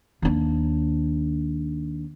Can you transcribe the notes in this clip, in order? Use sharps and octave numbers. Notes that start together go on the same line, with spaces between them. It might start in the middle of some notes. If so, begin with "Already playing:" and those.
D#2 D4